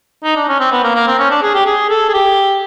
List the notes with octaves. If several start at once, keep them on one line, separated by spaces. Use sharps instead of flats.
D#4
D4
C#4
C4
B3
A#3
A#3
C4
C#4
D4
G#4
G4
G#4
A4
G#4
G4